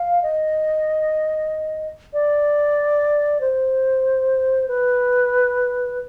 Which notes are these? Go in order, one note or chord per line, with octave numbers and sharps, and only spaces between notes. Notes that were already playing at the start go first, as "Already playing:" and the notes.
Already playing: F5
D#5
D5
C5
B4